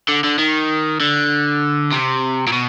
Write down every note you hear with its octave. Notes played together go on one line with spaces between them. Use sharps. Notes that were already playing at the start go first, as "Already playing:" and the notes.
D3
D3
D#3
D3
C3
A#2
B2